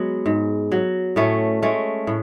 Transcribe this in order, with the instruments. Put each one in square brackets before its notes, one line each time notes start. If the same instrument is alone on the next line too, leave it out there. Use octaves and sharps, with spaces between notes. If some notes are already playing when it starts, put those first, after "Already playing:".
Already playing: [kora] F#3 G#3 B3
G#2
F#3
A2 A3 C#4
G#3 A3 C#4
A2